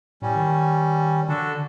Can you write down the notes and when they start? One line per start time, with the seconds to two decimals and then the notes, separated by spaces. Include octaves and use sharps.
0.22 A2 G3 C#4
0.36 D#3
1.29 D3 D4 F#4 A4